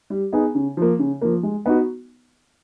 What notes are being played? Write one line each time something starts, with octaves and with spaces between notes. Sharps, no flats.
G3
B3 D#4 G#4
C#3
F3 A#3
C#3
F3 A#3
G#3
B3 D#4 F#4